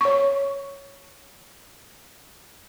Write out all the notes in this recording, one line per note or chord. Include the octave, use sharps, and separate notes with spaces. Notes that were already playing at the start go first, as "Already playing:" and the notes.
C#5 C#6